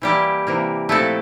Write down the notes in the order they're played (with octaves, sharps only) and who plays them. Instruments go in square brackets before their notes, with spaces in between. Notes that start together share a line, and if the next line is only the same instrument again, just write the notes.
[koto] E3 G3 A#3 E4 G4
C3 E3 A#3
A#2 F3 A3 C4 E4 A4